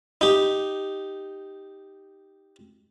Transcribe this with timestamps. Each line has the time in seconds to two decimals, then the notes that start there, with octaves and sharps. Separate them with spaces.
0.21 D#4 G4